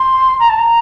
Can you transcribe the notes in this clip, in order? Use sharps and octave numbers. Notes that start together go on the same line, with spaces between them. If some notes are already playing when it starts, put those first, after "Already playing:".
Already playing: C6
A#5
A5
A#5